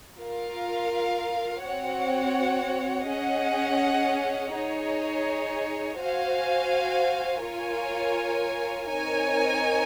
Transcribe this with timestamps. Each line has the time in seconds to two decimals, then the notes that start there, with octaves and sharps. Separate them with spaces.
0.18 F4 A#4 F5
1.64 C4 F#4 C#5 F#5
3.08 C#4 G#4 D#5 F#5
4.53 D#4 G#4 C#5
5.98 F#4 C5 F5 G#5
7.43 F4 A#4 C#5 G#5
8.88 C4 D#4 A#4 C#5 G#5